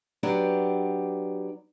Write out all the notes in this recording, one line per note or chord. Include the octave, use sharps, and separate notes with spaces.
F#3 B3 D4 G4 D5